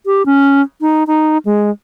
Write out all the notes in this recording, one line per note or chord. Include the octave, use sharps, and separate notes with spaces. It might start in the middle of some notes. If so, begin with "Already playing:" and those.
G4
C#4
D#4
D#4
G#3